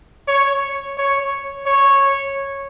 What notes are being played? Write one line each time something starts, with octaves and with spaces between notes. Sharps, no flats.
C#5
C#5
C#5